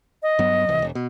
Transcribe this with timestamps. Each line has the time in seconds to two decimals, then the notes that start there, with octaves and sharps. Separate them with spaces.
0.23 D#5
0.39 G2 F#3 B3
0.69 D1 C2 E3
0.82 E1
0.95 B2